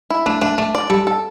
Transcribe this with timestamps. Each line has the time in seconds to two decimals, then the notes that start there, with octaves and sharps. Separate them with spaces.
0.10 E4
0.26 A3 D4
0.42 A3 D4
0.58 A3 D4
0.75 D5
0.90 G3 A4
1.07 A4